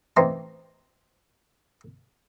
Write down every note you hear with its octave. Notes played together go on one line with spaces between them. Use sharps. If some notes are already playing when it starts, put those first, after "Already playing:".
A1 E3 C4 D#4 A#5 C6